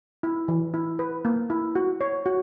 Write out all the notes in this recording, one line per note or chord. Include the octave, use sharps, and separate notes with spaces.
E4
E3
E4
B4
A#3
E4
F#4
C#5
F#4